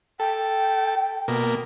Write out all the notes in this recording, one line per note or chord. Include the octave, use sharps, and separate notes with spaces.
A4 G5
B2 A#3